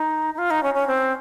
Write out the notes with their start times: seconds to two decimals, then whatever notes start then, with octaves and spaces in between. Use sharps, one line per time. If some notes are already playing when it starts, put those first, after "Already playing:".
Already playing: D#4
0.34 D#4
0.38 F4
0.51 D#4
0.63 C#4
0.74 C#4
0.87 C4